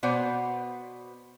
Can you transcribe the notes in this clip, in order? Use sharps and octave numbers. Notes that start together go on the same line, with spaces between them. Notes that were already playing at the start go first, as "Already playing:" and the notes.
B2 B3 C5 D5 F#5